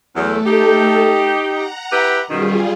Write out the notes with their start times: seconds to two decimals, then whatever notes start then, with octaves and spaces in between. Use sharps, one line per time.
0.16 E2 F#3 A3 A4
0.46 D#4 G4
1.46 F#5 A#5
1.92 E4 G4 B4
2.29 F#2 B2 D#3 G3 F4 G#4